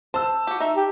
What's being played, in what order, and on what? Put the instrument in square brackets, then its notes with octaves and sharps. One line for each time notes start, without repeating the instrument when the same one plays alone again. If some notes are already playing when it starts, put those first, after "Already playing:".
[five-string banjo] C5 [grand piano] A5 E6
[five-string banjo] F#4 G4
D#4 E5
[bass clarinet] G4